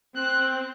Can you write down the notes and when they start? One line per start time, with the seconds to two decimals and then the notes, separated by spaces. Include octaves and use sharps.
0.16 C4 F#6